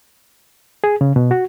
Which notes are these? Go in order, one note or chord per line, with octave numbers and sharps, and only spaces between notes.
G#4
C#3
B2
F#4